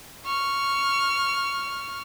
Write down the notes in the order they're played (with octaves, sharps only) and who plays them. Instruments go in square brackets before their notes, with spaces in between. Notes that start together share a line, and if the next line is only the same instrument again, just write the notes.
[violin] C#6 F6